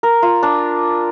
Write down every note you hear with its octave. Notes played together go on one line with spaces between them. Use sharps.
A#4
F4
D4